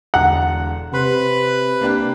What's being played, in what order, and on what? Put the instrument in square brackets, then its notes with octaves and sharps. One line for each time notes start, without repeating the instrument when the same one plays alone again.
[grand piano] E1 D3 A#5 [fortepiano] F#5
[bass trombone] C3 [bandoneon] B4 B5 [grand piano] C6
[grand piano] A#3 D4 G4